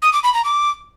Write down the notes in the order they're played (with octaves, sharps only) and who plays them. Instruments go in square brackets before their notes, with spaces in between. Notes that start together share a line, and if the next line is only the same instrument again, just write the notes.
[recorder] D#6
D6
B5
A#5
D6